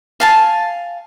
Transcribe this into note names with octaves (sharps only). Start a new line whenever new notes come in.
F5 G#5 A5